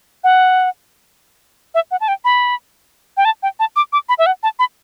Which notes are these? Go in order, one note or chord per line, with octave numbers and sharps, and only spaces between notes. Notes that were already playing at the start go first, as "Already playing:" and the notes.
F#5
E5
F#5
A5
G5
B5
G5
A5
G5
A5
D6
D6
B5
E5
F#5
A5
B5